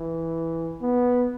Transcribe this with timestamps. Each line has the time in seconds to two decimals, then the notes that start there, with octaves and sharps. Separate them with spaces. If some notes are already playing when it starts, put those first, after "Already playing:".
Already playing: E3
0.81 B3